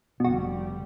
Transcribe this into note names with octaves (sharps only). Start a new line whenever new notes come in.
F1 B2 D3 G3 F#4